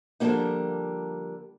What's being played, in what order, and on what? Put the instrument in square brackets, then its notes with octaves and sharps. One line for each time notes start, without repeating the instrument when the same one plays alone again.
[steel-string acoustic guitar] D3 F3 G3 G#3 A#3 D#4